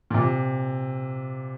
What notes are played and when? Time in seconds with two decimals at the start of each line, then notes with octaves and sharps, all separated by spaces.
0.11 A#2
0.14 C3